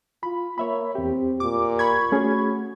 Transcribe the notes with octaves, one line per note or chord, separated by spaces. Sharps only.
F4 B5
A#3 C#5 E5 B5
E2 C4 G4
A#2 D6
B5 C#6 G#6
A3 C#4 F#4 G#4